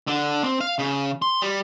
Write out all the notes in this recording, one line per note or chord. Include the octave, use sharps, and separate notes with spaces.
D3
C4
F5
C#3
C6
G3